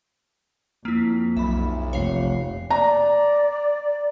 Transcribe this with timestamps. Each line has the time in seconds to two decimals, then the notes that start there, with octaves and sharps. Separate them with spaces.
0.85 F2 A#3 E4
1.37 B1 E5 B5
1.93 F1 C#5 F5 C7
2.70 D5 A#5